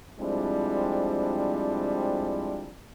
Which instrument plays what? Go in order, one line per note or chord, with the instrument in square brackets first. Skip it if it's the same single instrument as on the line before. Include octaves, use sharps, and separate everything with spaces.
[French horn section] F3 G3 G#3 C4 D4 E4